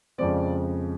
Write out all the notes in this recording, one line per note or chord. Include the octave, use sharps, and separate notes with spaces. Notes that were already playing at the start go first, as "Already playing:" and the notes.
F2 C#3 F3 G#3 C4 D5